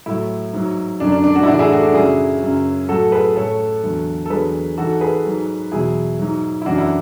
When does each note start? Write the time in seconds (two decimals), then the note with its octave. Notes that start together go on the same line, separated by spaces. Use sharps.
0.06 A2 F#3 E4
0.53 G#2 F#3
1.00 F#2 D3 F#3 D4
1.12 D4
1.24 D4
1.36 D4 F#4
1.43 E4
1.47 A2 E3 D4 F#4
1.59 E4 G#4
1.71 F#4 A4
1.83 D4 F#4
1.94 F#2 C#3 F#3 E4 G#4
2.41 F#2 C#3 F#3
2.89 A2 F#3 F#4 A4
3.12 G#4 B4
3.36 A2 F#3 A4 C#5
3.83 E2 D3 F#3
4.26 A4
4.30 E2 D3 F#3 G#4 B4
4.78 G#2 E3 F#4 A4
5.01 G#4 B4
5.24 G#2 F#3
5.72 E2 B2 F#3 E4 G#4
6.19 G#2 F#3
6.62 E4
6.66 F#2 E3 D4 F#4
6.78 E4